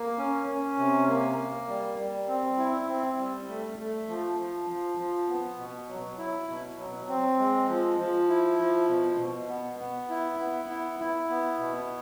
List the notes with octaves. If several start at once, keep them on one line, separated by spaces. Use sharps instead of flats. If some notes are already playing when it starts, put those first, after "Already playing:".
Already playing: A#3
C#4
C#4
C3
A#3
A#3
G3
G3
C4
E4
C4
G3
A3
A3
F3
F3
F3
F3
B3
B2
F#3
E4
B2
F#3
C4
G#3
F3
F3
E4
F3
B2
B2
B3
B3
E4
B3
E4
E4
B3
B2